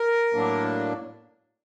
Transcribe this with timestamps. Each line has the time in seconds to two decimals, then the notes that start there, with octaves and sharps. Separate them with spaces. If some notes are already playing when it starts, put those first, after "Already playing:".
Already playing: A#4
0.34 A2 F#3 A#3 D4